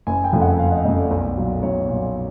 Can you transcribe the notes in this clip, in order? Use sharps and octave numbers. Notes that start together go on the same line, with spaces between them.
F#1 G#5
G5
F2 C#3 F3 A3
F#5
F#1 F5
D#5
F2 C#3 F3 A3 D#5
D5
B1
A#2 F#3
B1 C#5
A#2 F#3